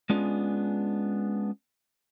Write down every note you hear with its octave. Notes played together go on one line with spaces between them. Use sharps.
G#3 B3 C#4 D4 F4 G#4